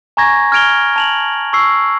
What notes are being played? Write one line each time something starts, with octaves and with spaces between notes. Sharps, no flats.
G#5 A#5 C#6 G#6 A#6
F6 G#6 D7 F7 G7
A5 F7 F#7
C#6 E6 C7